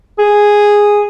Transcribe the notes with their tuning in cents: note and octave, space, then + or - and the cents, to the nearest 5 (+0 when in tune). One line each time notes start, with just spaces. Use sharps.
G#4 -5